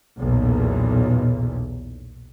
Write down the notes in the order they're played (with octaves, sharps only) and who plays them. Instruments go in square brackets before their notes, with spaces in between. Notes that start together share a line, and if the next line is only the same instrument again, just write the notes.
[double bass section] B1 E2 A#2